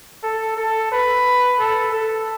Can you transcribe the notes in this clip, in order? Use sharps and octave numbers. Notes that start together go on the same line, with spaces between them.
A4
A4
B4
A4
A4